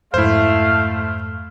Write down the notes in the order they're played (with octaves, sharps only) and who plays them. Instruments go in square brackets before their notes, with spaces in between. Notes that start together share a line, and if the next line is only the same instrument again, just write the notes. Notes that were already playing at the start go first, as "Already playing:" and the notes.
[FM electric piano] F2 G#2 [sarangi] A3 [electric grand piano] E4 C5 [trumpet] F5